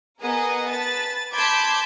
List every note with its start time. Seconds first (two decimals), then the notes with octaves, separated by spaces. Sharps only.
0.22 B3 G#4 A#4 D#5 F#5
0.69 B4 A5 A6
1.35 A5 B5 C6 D6 G6 G#6